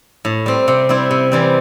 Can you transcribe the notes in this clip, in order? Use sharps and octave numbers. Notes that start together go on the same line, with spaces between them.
A2
G3 C4
C3
G3 C4 E4
C3
E3 G3 C4